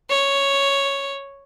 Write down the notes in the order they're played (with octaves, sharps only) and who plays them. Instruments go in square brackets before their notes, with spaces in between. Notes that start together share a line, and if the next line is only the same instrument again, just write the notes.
[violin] C#5